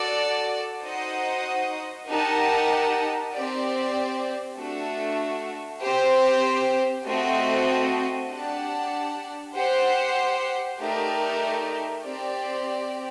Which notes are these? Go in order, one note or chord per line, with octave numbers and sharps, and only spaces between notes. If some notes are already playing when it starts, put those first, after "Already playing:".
Already playing: F#4 A4 D5
D#4 F#4 C5 D#5 F#5
D#4 G4 A#4 F#5 A5
C4 G4 D5
A3 D4 F#4 A4
C4 G4 C5
A3 C4 F#4 A4 D#5
D4 G4 D5 F#5 A5
G4 C5 F#5
A3 D#4 G4 A#4 D5
C4 G4 D5